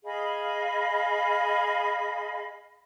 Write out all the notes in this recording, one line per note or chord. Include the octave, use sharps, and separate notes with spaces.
G#4 D#5 F5 B5